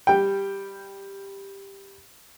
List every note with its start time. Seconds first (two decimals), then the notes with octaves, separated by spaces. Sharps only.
0.07 G3 G5